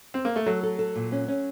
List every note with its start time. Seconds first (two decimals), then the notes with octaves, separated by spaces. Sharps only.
0.14 C4
0.25 A#3
0.36 A3
0.46 F#3 A4
0.63 A4
0.79 A4
0.96 A#2
1.12 C#4
1.28 C#4